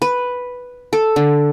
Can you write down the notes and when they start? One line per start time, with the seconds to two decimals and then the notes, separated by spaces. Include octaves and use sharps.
0.02 B4
0.93 A4
1.16 D3